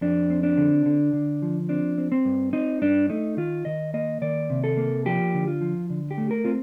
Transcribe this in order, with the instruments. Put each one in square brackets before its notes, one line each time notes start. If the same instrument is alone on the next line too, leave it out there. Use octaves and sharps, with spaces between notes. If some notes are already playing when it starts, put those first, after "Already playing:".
[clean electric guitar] F2 D4
C4
D4
D3
D3
D3
F3
C4 D4
C4
C4
G2
C4 D#4
G2 D4
A3 D#4
D#3 F4
D#3 D#5
A#3 D#5
D#3 D5
C3
A4
A#3
F3 G4
D3
F4
F3
D3
G4
A3
A#4
C4 F4